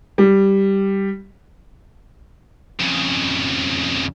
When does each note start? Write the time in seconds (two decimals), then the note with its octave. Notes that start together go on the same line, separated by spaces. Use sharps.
0.18 G3
2.80 F2 C#3